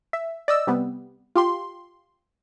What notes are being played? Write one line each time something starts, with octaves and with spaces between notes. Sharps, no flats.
E5
D5 D#5 E6
C3 G3 B3
F4 G4 C6